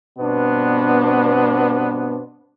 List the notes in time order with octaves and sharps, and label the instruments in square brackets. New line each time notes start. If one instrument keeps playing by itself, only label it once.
[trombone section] G2 B2 B3 C4 D4